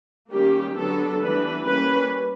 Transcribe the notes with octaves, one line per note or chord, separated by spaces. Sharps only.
D#3 G3 A#3 C#4 G4
D3 F#3 B3 D4 A4
E3 G3 B3 D4 B4
G3 A#3 C#4 B4